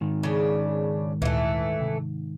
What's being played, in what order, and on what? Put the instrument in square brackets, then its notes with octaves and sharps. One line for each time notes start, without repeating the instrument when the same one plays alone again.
[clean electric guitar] G#2 D#3
[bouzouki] C#3 D4
[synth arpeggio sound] D2 A#2 [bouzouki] E3 A3
[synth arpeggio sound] C3